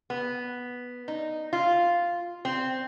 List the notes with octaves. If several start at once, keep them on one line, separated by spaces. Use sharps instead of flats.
B3
D#4
F4
C4